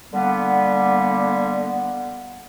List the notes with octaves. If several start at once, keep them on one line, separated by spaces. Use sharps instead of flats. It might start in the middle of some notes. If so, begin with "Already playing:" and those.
D3 G3 A#3 B3